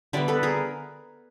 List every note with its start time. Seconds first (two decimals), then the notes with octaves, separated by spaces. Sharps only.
0.13 D3 G3 B3 D5 E5
0.28 A4 B4
0.43 G#4 A#4